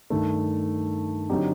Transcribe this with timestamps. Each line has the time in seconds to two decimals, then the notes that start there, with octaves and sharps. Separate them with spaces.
0.10 G2 D#3 A3
1.30 D3 F#3 C4 D#4 G4